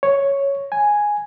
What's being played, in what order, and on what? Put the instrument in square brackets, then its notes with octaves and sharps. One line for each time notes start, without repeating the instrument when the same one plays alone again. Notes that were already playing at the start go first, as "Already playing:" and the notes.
[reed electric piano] C#5
G#5